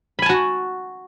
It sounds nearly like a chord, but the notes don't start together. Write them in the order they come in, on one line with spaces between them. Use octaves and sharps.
B5 G#5 A5 F#4